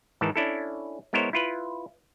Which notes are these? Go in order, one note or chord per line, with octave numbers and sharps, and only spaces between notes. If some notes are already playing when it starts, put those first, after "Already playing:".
G#2 D#3 E3 A5
C#4 D4 E4 A4
G#3 B3 E4 A#4 C5 C#5
E4 F4 B4